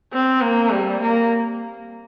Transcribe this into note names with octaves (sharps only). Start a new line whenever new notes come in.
C4
A#3
G3
A#3